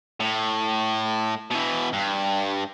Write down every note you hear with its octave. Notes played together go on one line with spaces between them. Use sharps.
A2
B2 E3
G2